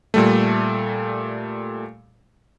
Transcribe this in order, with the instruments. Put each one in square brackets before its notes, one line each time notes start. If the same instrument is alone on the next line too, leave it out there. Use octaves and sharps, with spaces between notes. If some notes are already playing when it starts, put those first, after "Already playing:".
[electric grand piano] A#2 G3 A3